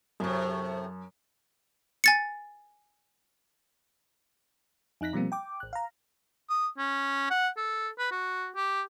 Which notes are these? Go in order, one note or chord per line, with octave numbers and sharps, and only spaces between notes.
F#2 A2 C3
G#5 A6 C#7
F2 D#4 F#6 A#6 B6
B2 F3 G3 A#3 C4
G5 D6
A1 F#6
F5 A#5
D#6
C#4
F#5
A4
B4
F#4
G4